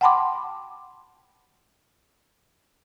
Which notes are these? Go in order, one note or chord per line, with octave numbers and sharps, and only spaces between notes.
F#5 G5 A5 B5 C6 D6